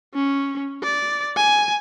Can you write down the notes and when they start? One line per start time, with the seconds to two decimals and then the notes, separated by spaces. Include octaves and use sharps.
0.14 C#4
0.83 D5
1.37 G#5